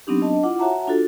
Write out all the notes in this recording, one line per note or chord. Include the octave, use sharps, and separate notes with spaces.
F#3 B3 C4 D4 D#4 G4
D4 D#5 A5
E4 F4 F#5 D6
F#4 C#5 E5 F#5 A5 A#5
D4 F4 F#4 A4